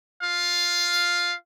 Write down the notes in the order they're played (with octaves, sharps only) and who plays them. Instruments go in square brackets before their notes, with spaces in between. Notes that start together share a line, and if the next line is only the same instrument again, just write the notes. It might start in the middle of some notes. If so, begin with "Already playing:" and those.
[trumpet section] F4 F5